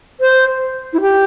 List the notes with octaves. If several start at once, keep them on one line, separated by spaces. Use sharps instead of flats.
C5
E4
G4